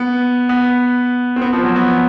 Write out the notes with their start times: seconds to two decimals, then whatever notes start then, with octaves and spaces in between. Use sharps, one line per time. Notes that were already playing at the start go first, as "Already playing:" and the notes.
Already playing: B3
0.49 B3
1.36 C4
1.42 B3
1.53 F3
1.64 F#3
1.76 B3